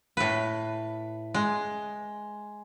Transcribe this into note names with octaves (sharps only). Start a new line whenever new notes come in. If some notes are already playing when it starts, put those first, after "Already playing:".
A2 B4
G#3